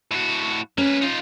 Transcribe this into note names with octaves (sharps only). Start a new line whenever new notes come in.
A2 F#4
A#3 C#4 B4
D#4 F4